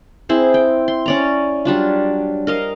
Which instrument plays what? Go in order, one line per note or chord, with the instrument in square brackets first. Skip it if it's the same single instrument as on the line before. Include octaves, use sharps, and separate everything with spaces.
[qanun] C4 E4 G#4 C5
G5
C6
C#4 D5 A#5
F#3 G3 D4 F4
A#4 D#5 F5